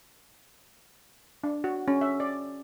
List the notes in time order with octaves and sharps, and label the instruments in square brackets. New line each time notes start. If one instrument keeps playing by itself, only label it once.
[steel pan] D4
F#4
C#4
E5
D5